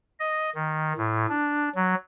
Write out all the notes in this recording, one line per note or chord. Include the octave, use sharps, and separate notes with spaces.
D#5
D#3
A2
D4
F#3